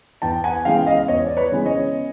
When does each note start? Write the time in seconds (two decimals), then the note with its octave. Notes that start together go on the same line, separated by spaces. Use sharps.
0.22 E2 G5 A5
0.44 F#5 G#5
0.65 C#3 E3 G#3 B3 F5 G5
0.87 D#5 F5
1.08 E2 C#5 D#5
1.27 D5
1.37 B4 C#5
1.52 C#3 E3 G#3 B3
1.65 C#5 D#5